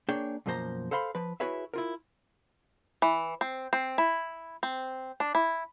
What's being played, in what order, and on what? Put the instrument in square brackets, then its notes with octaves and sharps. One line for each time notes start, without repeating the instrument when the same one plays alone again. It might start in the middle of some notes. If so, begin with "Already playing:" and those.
[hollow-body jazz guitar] A#3 D4 G#4 C#5 G5
F#2 B2 F3 A#3 C5 A#5
A4 C5 F5 B5 C6
F3 B4
E4 F#4 G#4 B4 C#5 E5
E4 F4 A#4
[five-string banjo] E3
C4
C4
E4
C4
D4
E4